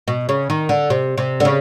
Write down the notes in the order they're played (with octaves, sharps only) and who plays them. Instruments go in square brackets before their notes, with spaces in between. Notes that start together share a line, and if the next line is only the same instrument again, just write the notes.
[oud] B2
C#3
D#3
D3
C3
C3
D3
C#3